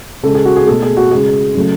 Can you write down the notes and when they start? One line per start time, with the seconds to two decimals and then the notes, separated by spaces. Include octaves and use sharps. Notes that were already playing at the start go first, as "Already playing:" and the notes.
0.23 C#3 G#3 A4
0.35 G#4
0.45 F#4
0.57 G#4
0.67 B2 A3 A4
0.82 G#4
0.97 F#4
1.11 C#3 G#3 G#4
1.55 C#3 F#3 A3